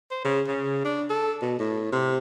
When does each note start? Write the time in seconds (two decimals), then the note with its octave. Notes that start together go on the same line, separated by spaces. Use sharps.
0.11 C5
0.24 C#3
0.47 C#3
0.85 D4
1.10 A4
1.42 B2
1.59 A2
1.92 C3